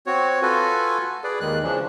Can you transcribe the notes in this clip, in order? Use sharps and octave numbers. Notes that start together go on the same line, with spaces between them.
C4 F#4 C#5
F4 F#4 A4 B4 G#5
G#4 B4 D5
D#2 D#3 G#3 F#6
C#3 E3 F3 D4